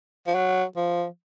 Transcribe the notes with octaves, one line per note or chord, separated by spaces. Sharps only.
F3
F#3
F3